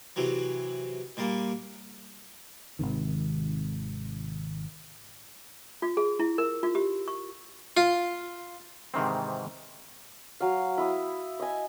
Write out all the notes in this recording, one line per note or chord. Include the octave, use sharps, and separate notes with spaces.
C3 E3 F#3
A#2 G3 A#3
G#1 C#2 C3 D#3
F4
G#4
E4
A#4
F4
G4
C#6
F4
G#2 C3 D#3 E3 C4
F#3 F5
E4 D#6
D#5 G#5